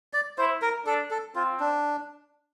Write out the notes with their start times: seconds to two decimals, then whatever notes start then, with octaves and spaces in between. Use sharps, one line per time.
0.13 D5
0.38 E4 C5
0.62 A#4
0.86 D4 A4
1.11 A4
1.36 C4 F4
1.60 D4